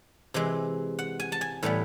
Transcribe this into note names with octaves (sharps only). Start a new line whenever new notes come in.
C3 E3 G#3
F#5
G#5
A5
G#5
A2 E3 G3 B3